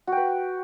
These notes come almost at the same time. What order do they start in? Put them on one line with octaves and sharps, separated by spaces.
F#4 G5 B4